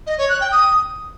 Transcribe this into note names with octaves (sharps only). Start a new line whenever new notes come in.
D#5
C#5
F#6
G5
D#6